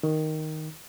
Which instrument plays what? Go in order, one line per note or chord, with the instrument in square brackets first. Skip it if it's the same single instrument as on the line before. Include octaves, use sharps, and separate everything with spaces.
[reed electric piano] D#3